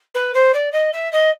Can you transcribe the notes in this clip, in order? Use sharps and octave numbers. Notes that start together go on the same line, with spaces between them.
B4
C5
D5
D#5
E5
D#5